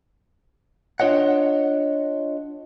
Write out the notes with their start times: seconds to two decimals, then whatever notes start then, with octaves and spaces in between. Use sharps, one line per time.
1.00 D4 F4 C#5 D#5 F#5